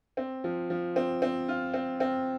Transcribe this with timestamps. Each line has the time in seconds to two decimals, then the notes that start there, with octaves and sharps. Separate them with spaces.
0.17 C4
0.44 F3
0.70 F3
0.96 C4
1.22 C4
1.48 F4
1.74 C4
2.00 C4